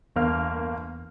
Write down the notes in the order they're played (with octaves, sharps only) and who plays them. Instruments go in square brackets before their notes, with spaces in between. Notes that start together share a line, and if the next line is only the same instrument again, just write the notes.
[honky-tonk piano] G1 A#3 F6 [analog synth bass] E2